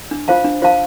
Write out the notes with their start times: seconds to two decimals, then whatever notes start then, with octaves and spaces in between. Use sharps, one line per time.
0.11 D4
0.28 F4 C5 F5 A5
0.44 D4
0.62 F4 C5 F5 A5